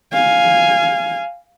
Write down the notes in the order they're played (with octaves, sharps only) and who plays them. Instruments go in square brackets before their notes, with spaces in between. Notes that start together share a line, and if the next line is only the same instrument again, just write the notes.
[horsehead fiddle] F5 G#5